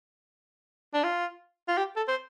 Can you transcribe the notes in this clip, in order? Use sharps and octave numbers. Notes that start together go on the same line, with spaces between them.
D4
F4
F4
G4
A4
C5